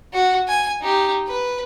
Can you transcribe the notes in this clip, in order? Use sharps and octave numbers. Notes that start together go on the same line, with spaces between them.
F#4
G#5
D#4 G4
B4